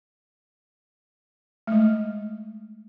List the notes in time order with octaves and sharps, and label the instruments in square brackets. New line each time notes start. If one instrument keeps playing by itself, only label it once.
[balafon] G#3 A3